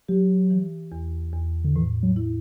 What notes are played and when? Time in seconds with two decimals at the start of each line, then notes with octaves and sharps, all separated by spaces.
0.08 F#3 G4
0.50 E3
0.92 E2
1.34 E2
1.64 D3
1.76 A2 E3
2.03 F#3
2.16 E4